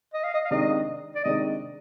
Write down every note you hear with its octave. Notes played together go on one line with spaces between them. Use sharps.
D#5
F5
D#5
F5
C3 D#3 G#3 D4 D#5
D5
C3 D#3 G#3 D4 D#5